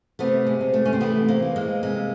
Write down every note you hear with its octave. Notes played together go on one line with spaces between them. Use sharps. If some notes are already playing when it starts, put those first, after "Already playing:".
C3 A3 B3
G#3
C3
A3
C#4
C4
E3 A3 B3
A#3 C4
E3
G#3 A#3
C3 G#3 A#3